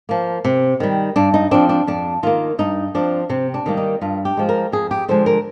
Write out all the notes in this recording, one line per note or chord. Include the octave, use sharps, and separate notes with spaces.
F3 A#3
C3
D#3 G3
G2 D4
D#4
F3 C4 D4
D4
F2 D4
D#3 A#3 F4
G2 D#4
F3 C4 D4
C3 C4
D4
D#3 G3 A#3
D#4
G2 F4
G4
F3 G#3
A#4
F2 G#4
G4
D3 F3 G#3 C5
A#4